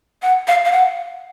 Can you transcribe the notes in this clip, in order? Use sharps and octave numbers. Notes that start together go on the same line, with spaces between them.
F#5
F5
F5
F#5